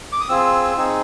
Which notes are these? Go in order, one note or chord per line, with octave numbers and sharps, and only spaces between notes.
D6
D#6
C4 F4 G#4 E6
C4 D#4 G#4